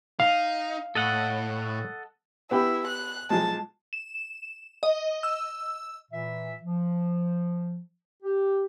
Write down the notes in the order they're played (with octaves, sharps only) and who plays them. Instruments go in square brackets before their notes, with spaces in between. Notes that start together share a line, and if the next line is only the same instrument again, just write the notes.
[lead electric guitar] D#4 [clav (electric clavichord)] F5
[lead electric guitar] A2 [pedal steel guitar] A4 D#5 F#5
[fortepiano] B3 G4 B5 [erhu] E4
[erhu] F#6
[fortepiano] B1 F3 G#3 [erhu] A5
[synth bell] E7
D#5
E6
[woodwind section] A#2 E3 E5
F3
G4